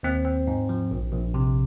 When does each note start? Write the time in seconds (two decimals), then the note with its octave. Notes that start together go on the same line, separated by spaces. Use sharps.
0.03 D#2 C4
0.25 C4
0.47 G#2
0.69 F3
0.91 A#1
1.12 A#1
1.34 C3